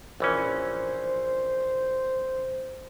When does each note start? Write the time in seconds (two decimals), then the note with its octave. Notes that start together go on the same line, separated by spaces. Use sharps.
0.20 A#1 E3 C#4 C5